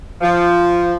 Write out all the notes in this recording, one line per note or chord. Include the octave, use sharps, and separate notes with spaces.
F3